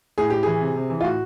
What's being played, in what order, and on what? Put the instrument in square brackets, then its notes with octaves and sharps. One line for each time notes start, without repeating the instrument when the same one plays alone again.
[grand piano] A2 G#4
A2 G4
E3 G#4
C3
C3
E3
F4
A2 F#4